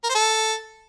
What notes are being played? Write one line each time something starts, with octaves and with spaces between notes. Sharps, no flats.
A#4
C5
A4